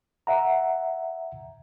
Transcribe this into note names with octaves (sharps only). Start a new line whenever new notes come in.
E5 F#5 A#5